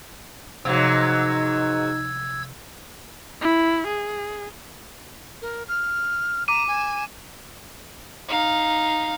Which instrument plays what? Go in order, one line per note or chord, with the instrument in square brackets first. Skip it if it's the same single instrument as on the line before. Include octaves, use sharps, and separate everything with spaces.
[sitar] G#2 F#3 [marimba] C3 F3 [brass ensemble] D#4 [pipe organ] E6 G#6
[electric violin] E4
G#4
[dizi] A#4
F6
[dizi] A#5 [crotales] D6 D#7
[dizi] G#5
[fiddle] D#4 F5